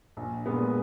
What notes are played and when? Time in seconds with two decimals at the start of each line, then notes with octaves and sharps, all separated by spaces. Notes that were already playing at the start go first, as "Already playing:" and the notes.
0.17 A#1
0.46 A#2 G#3 B3